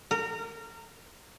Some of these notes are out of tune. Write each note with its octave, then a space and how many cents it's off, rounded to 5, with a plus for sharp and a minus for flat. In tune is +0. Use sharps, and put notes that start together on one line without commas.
A#4 -25